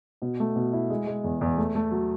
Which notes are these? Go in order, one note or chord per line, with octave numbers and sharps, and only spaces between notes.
B2
A3
B2
E4
G#3
G#3
E2
E2
A3
A3
F#3